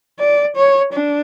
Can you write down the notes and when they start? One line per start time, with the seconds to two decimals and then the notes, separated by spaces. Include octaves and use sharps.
0.19 D5
0.56 C#5
0.93 D4